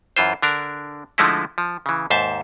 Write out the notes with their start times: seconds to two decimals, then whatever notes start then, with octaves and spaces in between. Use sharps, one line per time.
0.17 F#2 E3 F4 C5
0.42 D3 D4 A#4
1.18 D3 F3 G#3 A3 D#4 E4
1.58 F3
1.86 C#3 E3
2.10 D#2 G#2 C5 E5 A5